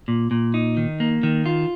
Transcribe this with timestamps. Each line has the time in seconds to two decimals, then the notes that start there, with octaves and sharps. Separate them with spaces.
0.08 A#2
0.31 A#2
0.54 D#4
0.77 D#3
1.00 A#3
1.23 D#3
1.46 F4